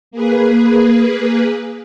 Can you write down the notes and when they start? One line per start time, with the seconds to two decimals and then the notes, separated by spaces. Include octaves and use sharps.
0.11 A#3 G#4 B4